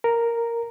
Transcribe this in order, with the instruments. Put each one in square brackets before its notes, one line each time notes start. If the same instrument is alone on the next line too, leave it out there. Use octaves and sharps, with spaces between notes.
[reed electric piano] A#4